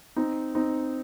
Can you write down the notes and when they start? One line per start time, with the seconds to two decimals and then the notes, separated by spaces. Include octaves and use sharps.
0.16 C4 D#4
0.55 C4 D#4